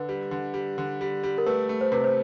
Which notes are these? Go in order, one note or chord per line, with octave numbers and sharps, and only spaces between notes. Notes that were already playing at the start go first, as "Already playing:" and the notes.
Already playing: D3 B4
G3
D3
G3
D3
G3
G3
A#4
A3 B4
A3
C5
C3 B4
C5